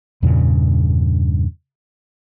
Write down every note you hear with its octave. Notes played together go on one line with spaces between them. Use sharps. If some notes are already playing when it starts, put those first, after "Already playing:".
E2 G2 A#2 C#3